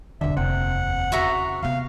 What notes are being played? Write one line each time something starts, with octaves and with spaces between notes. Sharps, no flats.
E1 G2 D3 E5
F1 D#2 C3 F#5
E2 C#3 F#4 E5 A#5
C3 B3 F5